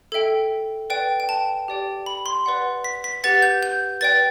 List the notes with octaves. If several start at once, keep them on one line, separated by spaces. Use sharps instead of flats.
A4 E5 G5
B4 D5 G5
G5
A5
G4 D5 G5
B5
C6
B4 D5 F#5
B6
B6
G4 B4 F#5 A6
G6
G6
B4 D5 G5 A6